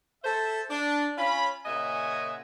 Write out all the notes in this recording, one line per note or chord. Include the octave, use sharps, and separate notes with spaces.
A4 C5 E5
D4
C#4 F4 B5
A#2 C#3 D#5 E5 F#5 G#5